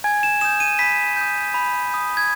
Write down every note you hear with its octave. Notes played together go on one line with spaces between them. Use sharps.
G#5 G#6
E7
D#6 G6 E7
D#7
B5 B6
D#6 G6
B5
D#6 G6
G#6